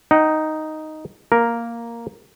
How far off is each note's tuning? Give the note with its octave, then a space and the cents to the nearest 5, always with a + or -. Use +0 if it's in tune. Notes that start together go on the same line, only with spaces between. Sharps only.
D#4 +0 G5 -45
A#3 +0 A#4 +0